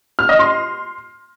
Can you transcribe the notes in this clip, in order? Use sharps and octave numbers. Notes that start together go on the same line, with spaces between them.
F6
D#5
C6